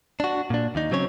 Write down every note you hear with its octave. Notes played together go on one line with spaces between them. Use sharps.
D4 F#4
A#2 D4
D#2 D#4
C#3 F#3 C4 C#4 C#5